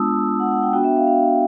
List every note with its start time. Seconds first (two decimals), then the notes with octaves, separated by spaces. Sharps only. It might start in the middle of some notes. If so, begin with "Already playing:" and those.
Already playing: G#3 B3 D4 F4 A5 D#6 E6
0.40 F#5
0.51 F#5
0.63 G5
0.73 B3 D4 F#4 G5
0.84 E5
0.97 F5
1.07 F5